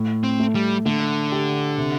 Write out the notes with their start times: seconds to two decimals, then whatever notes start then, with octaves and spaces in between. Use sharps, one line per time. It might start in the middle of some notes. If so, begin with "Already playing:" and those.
Already playing: A2
0.24 C4
0.40 A3
0.55 G3
0.85 D3 A3
1.32 G4
1.78 C3